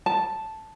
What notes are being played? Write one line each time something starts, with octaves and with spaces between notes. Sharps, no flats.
A5